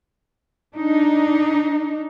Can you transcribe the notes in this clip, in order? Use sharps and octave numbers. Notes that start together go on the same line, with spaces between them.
D4 D#4